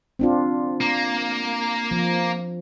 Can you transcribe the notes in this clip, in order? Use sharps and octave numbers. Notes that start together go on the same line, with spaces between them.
C4 D4 F4
A#3
F3